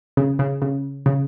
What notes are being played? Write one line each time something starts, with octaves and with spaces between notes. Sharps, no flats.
C#3
C#3
C#3
C#3